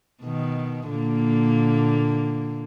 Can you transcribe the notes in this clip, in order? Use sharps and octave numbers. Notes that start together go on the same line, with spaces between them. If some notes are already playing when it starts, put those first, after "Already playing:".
B2 D#3
A#2 D3 A#3